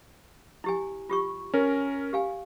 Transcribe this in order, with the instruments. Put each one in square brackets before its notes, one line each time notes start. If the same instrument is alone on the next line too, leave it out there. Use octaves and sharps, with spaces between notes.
[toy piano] E4 G4 G#5
F4 G4 C#6
[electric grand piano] C#4 A#4
[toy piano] G4 F5 G#5